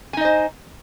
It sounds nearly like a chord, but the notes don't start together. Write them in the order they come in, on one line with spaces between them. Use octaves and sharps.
G#5 D#4 D#5 C5